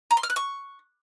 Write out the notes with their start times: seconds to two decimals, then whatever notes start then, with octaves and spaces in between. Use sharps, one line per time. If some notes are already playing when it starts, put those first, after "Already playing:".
0.11 A#5
0.17 C6
0.23 F6
0.30 F#6
0.36 C#6